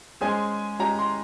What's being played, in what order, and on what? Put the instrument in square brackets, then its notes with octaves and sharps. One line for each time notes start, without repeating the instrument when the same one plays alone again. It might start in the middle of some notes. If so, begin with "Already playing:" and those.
[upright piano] G#3 C#4 G#4 C5 [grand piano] G#5
[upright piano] G#3 C#4 G4 [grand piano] A#5
[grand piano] C6